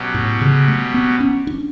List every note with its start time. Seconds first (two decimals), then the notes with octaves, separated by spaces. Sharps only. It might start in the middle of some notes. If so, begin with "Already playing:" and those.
Already playing: B2 F#3 C#4 G4
0.14 A2
0.41 C#3
0.68 A3
0.94 B3
1.20 C#4
1.47 D4